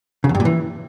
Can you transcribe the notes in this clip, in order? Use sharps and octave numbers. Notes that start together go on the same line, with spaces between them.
C#3
E2
G2
A#2
E3